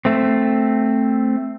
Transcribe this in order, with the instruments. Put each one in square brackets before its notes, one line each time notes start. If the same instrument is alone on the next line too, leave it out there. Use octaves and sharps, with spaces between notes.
[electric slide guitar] A3 C4